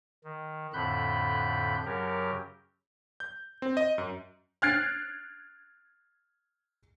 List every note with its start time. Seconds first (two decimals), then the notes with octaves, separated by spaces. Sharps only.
0.24 D#3
0.73 F2 A2 D3 B5 F#6 G6
1.85 F#2 C#3 F#3 G4 A#4
3.20 G6
3.62 C4
3.77 D#5
3.98 F#2
4.62 F6 F#6 G#6 A6 C7 D7